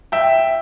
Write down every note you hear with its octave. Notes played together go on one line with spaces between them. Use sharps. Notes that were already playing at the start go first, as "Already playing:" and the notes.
E5 G5